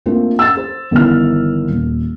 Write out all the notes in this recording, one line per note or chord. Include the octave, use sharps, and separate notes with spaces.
A3 A#3 C4 D4 F4
E6 A6
C5
G1 D#3 E3 F6
D#1